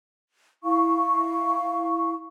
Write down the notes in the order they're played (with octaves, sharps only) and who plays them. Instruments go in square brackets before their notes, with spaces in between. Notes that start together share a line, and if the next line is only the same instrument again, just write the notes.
[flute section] E4 F5 C#6